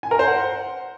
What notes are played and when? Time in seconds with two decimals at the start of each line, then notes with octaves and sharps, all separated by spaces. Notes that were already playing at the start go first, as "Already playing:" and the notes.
0.03 G#5
0.11 A#4
0.19 C5
0.27 F#5